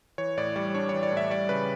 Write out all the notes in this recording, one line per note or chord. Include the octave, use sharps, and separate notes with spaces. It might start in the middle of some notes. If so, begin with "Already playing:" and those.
E3 C#5
A2 D5
G3 D5
D4 C#5
E3 C#5
D5
A2
E5
G3 D5
C#3 B4